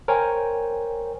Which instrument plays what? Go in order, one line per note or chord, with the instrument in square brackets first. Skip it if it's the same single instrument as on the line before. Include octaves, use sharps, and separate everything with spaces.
[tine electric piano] A#4 C5 C#5 G5 G#5